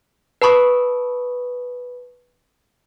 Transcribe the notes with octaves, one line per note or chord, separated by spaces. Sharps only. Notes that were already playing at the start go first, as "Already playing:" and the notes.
B4 A5 B5 C#6 D#6